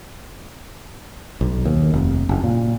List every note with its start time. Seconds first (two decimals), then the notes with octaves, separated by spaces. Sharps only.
1.41 B1
1.65 D#2
1.93 F1
2.29 F#1
2.44 A#2